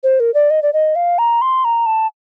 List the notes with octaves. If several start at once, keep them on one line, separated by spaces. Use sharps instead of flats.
C5
A#4
D5
D#5
D5
D#5
F5
A#5
C6
A#5
A5